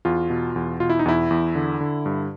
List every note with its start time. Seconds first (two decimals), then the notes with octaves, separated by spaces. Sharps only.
0.05 E2 F4
0.30 B2
0.56 E2
0.80 B2 F4
0.90 E4
0.99 D#4
1.06 E2 E4
1.31 E2
1.55 D3
1.81 D3
2.06 G2